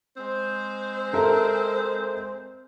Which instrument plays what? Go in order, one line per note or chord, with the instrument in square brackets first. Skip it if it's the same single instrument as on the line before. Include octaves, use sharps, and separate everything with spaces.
[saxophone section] G#3 C4 C5
[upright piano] A4 A#4 E5